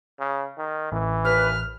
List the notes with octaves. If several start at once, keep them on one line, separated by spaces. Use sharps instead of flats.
C#3
D#3
A1 E3
D#2 B4 F6